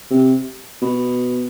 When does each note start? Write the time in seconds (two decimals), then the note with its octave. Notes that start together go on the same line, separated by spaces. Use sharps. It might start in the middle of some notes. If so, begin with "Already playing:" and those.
0.11 C3
0.82 B2